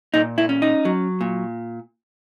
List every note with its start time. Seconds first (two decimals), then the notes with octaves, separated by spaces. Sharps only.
0.14 A#2 D#4
0.38 E4
0.49 C#4
0.62 D#4
0.85 F#3
1.21 A#2